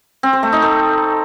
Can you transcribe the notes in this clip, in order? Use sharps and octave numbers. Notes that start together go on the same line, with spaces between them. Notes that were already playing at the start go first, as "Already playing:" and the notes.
C4
C5
A3
D#4
A3